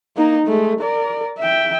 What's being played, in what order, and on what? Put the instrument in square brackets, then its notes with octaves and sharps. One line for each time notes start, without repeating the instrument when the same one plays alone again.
[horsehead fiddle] A#3 D#4
G#3 A3
A#4 D5
E5 G5